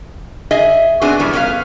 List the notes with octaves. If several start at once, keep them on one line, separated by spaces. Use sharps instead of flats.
G#4 D#5 E5 G#5
B3 C4 D4 F#4 G#4
F#2 E3 G3
B3 C#4 F#4 A#4 B4 F5